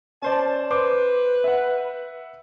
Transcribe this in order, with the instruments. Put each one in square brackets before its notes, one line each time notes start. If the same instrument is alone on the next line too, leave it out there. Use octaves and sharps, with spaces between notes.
[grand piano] C#4 C5 D5 [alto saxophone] A5
[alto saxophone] B4 [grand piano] C5 D6
[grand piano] E5 F#5